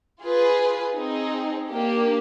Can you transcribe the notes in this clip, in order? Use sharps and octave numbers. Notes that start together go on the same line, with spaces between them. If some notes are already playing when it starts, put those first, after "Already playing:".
F4 G#4 B4
C4 D#4 G#4
A#3 D4 G4